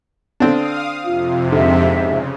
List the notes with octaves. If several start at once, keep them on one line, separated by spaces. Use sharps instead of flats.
D3 C4 D4 F5 D#6
F2 C3 F4
G#2 D3 E5
C#3